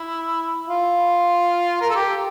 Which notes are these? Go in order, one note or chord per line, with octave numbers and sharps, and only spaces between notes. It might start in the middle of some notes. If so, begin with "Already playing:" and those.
Already playing: E4
F4
A#4
A4
G4